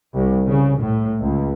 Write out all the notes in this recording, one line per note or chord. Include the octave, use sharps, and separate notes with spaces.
C2
C#3
A2
C#2